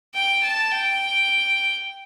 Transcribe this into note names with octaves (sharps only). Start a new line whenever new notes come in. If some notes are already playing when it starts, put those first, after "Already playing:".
G5
A5
G5